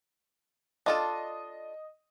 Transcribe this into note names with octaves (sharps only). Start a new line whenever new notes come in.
D4 F4 A4 D#5